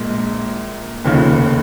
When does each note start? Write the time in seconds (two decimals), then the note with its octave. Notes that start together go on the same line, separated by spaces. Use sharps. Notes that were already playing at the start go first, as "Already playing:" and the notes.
Already playing: A#1 A#2 G#3
1.05 F1 D#2 C#3 F3